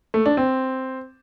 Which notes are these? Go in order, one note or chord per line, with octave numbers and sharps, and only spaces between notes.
A3
D4
C4